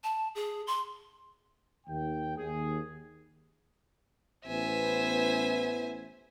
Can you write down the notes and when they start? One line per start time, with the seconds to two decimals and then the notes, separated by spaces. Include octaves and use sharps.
0.04 A5
0.35 G#4
0.67 C6
1.87 D#2 G5
2.37 D#2 G#4
4.47 A1 B3 C5 E5 G#5